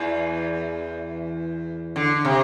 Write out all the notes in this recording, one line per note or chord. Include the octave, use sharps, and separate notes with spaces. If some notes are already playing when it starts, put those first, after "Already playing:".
Already playing: E2 E3
D3
C3